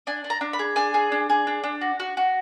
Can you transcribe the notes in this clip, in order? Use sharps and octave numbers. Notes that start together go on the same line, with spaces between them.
D4 G#5
D4
A#5
D4
B5
G#4
D4 G#5
G#4
D4
G#4
D4
D4
F#4
F#4
F#4